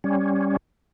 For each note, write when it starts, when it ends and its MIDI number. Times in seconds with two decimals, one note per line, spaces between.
0.04 0.57 55
0.04 0.57 61